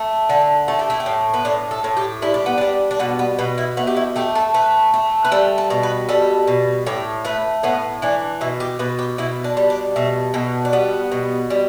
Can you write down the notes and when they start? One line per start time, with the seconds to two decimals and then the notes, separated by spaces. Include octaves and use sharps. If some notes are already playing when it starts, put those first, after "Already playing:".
Already playing: A3
0.29 D3 A4
0.68 A3 A4
0.79 G4
0.90 E4
1.00 G4
1.06 A2
1.34 B3
1.45 A2 D4
1.71 A4
1.84 A2
1.97 G4
2.22 G3 E4
2.34 D4
2.46 B3
2.58 G3 D4
2.91 D4
2.99 B2 B3
3.19 B3
3.39 B2 B3
3.58 E4
3.77 A3 B3
3.87 G4
3.96 E4
4.16 A3 G4
4.35 A4
4.54 A3 B4
4.94 A3
5.25 B4
5.32 G3 A4
5.58 A4
5.70 B2
5.83 B4
6.08 G3 A4
6.47 B2
6.86 A2 G4
7.24 A3 B4
7.63 A2 B3
8.02 E3 D4
8.41 B2 E4
8.60 G4
8.79 B2 B4
8.99 G4
9.18 B2 E4
9.44 D4
9.57 G3
9.70 D4
9.96 B2 A3
10.34 B2 A3
10.65 D4
10.73 G3 B3
11.11 B2
11.50 G3